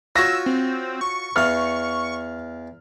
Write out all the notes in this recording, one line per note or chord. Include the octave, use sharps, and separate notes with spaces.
F4 F#4 C#5 E6 A#6
C4
C#6
E2 F5 F6